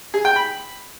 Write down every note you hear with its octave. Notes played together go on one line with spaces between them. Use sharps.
G#4
G5
B5